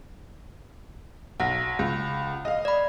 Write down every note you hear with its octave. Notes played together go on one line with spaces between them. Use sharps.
B1 F#5 A#6
C#2
D#5 F5
D5 B5